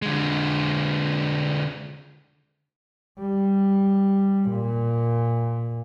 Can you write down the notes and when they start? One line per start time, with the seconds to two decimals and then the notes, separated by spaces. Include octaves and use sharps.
0.02 D3 G#3
3.20 G3
4.50 A#2